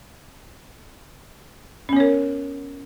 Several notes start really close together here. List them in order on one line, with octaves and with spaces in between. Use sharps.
C#4 B3 C#5 A#4